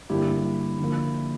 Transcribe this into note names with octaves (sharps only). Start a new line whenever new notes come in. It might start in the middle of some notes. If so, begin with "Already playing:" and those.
G2 D3 G3 A#3 E4 G4
D3 F3 A#3